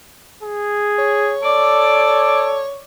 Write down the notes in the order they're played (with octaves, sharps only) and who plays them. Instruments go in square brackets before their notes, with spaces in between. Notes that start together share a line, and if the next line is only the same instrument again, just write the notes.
[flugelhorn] G#4
[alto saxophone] C#5
[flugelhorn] A4 [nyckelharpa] D5 D6